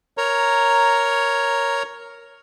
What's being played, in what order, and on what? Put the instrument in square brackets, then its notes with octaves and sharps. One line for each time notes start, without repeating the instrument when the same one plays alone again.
[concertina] A#4 C#5 A#5